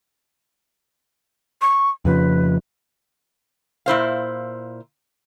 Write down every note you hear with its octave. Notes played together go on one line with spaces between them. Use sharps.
C#6
F2 C#3 F3 B4
A#2 E4 C5 F5